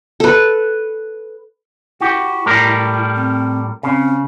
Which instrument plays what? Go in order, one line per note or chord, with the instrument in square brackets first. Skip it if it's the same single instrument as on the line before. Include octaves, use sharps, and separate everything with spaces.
[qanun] A4 B4
[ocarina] E4 [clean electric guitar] F#4 G4
[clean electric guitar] A2 G3 A#4
[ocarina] C4
[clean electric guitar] C#3 [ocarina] C4